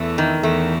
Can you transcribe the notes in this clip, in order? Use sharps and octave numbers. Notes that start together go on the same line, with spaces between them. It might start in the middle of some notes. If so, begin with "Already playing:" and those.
Already playing: E2 E3 A3
D#3
E2 E3 A3